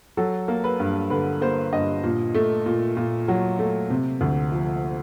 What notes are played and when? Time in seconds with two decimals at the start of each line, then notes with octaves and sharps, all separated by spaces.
0.17 F#3 A4
0.48 A#3
0.64 B4
0.80 G2
1.10 D3 B4
1.41 A#3 C5
1.73 G2 D#5
2.03 A#2
2.34 A3
2.66 A#2
2.97 A#2
3.28 F#3
3.59 A3
3.90 C3
4.21 D2
4.52 F3